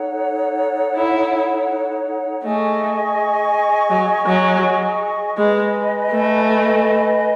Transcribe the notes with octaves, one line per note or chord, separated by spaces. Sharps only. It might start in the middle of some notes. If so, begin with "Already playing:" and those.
Already playing: D#4 A4 C#5 F#5
E4
A3 G#4 D#5 G#5 C#6
F#3
F#3
G#3 B4 D#5 G#5 B5
A3